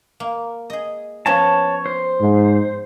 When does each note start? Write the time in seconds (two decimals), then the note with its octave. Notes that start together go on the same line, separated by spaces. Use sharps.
0.20 A#3
0.70 G#4 D#5
1.26 F3 B3 C#4 C#5 A5
1.86 C5
2.21 G#2